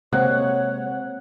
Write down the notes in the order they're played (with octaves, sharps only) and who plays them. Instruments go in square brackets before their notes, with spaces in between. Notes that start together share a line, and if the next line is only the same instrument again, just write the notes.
[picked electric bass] C3 G#3 A#3 [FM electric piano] C4 [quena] C#5 [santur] F#5